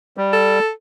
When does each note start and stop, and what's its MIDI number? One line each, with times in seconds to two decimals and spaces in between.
0.17 0.59 55
0.33 0.70 69